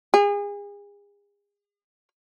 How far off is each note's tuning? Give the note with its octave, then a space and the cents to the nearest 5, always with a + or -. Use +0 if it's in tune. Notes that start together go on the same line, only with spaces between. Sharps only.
G#4 -35